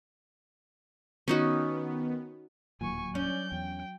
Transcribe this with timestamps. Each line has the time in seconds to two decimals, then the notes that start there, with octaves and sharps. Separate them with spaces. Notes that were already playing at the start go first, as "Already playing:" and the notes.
1.28 D#3 B3 C#4 D#4 F#4
2.81 D1 D#2 A#2 F#3 G#5 C#6
3.15 C#4 D5 G6
3.52 E2 G5